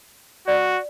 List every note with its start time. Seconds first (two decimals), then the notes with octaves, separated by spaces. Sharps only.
0.48 F#4 D5